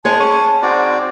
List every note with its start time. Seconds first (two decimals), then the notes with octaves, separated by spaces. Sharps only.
0.05 G#3 G#4 C#5 A5
0.20 C#4
0.62 G#2 C4 F#4 D5